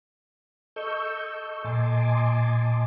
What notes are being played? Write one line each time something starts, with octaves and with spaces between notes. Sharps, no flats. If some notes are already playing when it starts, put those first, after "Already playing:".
A4 D#5 C#6 E6 G6
A#2 D#5 G#5 A5 C6 D6